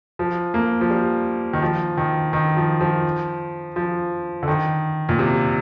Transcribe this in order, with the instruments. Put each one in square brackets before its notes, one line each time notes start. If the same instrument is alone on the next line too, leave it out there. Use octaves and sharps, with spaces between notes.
[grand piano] F3
A#3
F3
G3
D#3
F3
D#3
D#3
F3
F3
F3
D3
D#3
A#2
C3